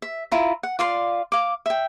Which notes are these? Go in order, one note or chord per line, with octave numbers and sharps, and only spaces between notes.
E5
E4 F4 A#5
F#5
F4 D5 F5 C6
F5 D6
E5 G5